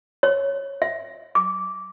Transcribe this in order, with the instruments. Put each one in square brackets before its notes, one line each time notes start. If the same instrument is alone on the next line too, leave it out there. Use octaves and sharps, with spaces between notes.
[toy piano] C#5
E5
D6